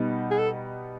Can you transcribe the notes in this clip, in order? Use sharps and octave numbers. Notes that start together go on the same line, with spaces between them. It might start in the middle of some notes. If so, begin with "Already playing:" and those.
Already playing: B2 G3 B3 D#4
G#4
A4